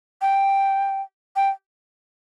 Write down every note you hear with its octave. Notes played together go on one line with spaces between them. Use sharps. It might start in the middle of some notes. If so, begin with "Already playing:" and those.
G5
G5